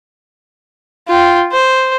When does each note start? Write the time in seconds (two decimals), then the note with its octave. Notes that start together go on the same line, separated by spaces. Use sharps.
1.08 F4 G5
1.52 C5